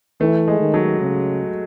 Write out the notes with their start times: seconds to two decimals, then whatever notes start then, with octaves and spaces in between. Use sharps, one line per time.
0.21 E3 A3
0.48 G#3
0.60 D#3
0.74 F#3
1.01 C#3